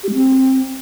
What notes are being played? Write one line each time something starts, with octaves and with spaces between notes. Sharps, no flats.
G4
G#3
C4